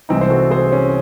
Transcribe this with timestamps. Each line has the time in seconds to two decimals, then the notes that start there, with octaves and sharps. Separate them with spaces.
0.09 C2 C3 E3 G#3 C4 D#4
0.21 C5
0.30 F#4 A4
0.50 G#4 C5
0.72 C#4